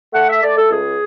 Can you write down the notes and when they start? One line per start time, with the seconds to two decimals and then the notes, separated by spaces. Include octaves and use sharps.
0.13 A3 F#5
0.28 E5
0.42 A3 D5
0.57 A4
0.71 C#2 G#4